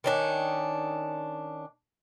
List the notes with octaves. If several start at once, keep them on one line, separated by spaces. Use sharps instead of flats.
D#3 C#4 D4